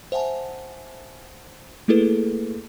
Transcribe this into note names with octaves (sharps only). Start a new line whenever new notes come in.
C5 E5 F#5 G#5 A5
A3 A#3 E4 G#4 A4 B4